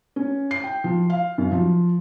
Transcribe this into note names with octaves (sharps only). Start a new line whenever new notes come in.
C#4
C7
G5
F3
F5
F#2
F3